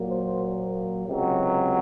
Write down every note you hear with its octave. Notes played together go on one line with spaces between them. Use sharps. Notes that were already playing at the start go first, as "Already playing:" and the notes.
Already playing: A#2 F#3 A#3
C5
C#2 C3 F#3